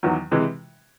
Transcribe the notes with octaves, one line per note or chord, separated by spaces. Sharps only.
E2 D#3 F#3
C3 E3 G#3